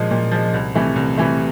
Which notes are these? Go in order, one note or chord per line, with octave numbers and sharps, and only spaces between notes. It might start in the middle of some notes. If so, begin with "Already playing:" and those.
Already playing: A#2 F3 G#3
A#2
F3 G#3
C2
C3 E3 A3
C2
C3 E3 A3